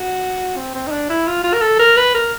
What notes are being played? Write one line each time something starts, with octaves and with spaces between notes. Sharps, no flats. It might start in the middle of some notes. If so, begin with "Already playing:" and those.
Already playing: F#4
C4
C4
D#4
D4
E4
F4
F4
A#4
A4
A#4
B4
A#4